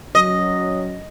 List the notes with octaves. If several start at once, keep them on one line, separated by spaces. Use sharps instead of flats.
F#3 C#4 D#5